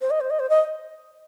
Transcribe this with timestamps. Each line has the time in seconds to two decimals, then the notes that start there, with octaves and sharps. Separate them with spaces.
0.01 C5
0.10 D#5
0.21 C5
0.30 D#5
0.39 C5
0.50 D#5